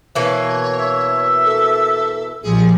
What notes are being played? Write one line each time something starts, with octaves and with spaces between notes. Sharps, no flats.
B2 E3 A#3 C#5
E5
A4
A#1 F3 G3 G#4